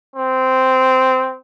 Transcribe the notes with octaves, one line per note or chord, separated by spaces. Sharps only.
C4